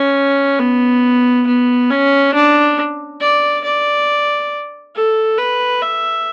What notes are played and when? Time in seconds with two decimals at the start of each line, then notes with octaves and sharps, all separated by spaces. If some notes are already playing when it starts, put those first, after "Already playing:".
Already playing: C#4
0.59 B3
1.47 B3
1.90 C#4
2.34 D4
3.21 D5
3.64 D5
4.96 A4
5.38 B4
5.82 E5